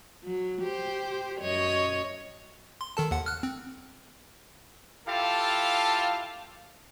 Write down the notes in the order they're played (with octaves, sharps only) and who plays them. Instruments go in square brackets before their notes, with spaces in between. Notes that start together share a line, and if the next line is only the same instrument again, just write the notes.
[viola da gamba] F#3
G4 C5
F#2 C#5 D#5
[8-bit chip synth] C6
D#3 A4 A5
D#2 F#5
F6 F#6
C4
[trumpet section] E4 F4 G4 A4 F5 A5